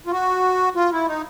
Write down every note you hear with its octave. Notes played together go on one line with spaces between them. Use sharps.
F4
F#4
F4
E4
D#4